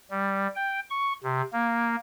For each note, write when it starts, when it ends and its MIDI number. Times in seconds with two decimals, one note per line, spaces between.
0.11 0.48 55
0.55 0.80 79
0.91 1.13 85
1.23 1.42 48
1.53 1.96 58